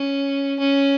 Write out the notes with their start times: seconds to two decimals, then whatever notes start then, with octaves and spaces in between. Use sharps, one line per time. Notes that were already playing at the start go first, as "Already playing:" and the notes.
Already playing: C#4
0.60 C#4